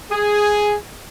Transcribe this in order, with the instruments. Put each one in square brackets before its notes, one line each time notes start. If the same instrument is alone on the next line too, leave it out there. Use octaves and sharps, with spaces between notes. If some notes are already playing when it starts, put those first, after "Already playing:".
[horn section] G#4